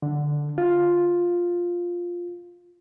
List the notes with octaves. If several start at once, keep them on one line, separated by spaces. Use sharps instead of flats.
D3
F4